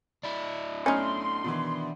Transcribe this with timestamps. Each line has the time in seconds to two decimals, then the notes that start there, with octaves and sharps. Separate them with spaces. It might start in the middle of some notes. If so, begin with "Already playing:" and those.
0.24 D4 E4
0.86 B1 A3 C#4 D#4 C6 F6
1.44 B2 D#3 E3